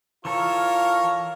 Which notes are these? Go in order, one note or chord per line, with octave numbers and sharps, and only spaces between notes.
E3 F4 A4 A#4 C#5 F5